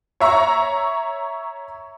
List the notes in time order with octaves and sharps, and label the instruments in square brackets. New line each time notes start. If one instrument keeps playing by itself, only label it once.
[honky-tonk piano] C#5 E5 A#5 C#6